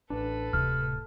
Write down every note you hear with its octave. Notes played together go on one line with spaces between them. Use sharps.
A1 D4 A4 B4
D1 A2 C3 F6